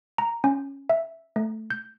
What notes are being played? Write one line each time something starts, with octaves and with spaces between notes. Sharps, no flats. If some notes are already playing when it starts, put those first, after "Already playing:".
A#5
C#4
E5
A3
G6